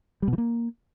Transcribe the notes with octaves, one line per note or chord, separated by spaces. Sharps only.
G3
B2
E3
A#3